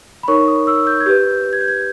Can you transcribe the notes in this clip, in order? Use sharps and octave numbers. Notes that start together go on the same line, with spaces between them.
B5
D#4 A#4 C#5 C#6
D#6
E6
G6
G#6
G4 B4 G6
G#6
G6
G#6